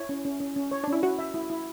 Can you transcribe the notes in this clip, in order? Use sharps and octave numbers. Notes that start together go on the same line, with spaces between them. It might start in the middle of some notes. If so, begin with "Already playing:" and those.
Already playing: E4 C#5
C#4
C#4
C#4
C#4
C#5
C#4 D4
E4
E4 F#4
E5
E4
E4